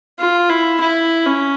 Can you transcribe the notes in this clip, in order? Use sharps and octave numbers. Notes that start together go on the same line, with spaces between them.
F4
E4
E4
C#4